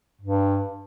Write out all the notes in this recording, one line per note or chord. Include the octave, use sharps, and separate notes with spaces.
G2